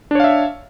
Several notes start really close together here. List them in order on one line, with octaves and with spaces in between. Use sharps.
D4 C#5 F5 E5